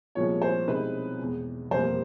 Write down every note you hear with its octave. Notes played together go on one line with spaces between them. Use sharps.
C2 A#2 F3 G#3 B3 C#5
C5
C2 B2 G#3 C4 D#4 B4
E2 B2 G#3
F1 E2 B2 G3 A#3 C5